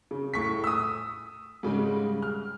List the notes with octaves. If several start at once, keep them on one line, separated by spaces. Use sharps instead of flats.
C#3
A2 C#6 B6
D#6 E6
G#2 C#3 G3 G#3
F6